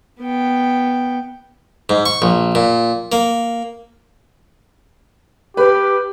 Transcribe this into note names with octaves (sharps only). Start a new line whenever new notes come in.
B3 G5
G#2
C#6
A#1
A#2
A#3
G4 B4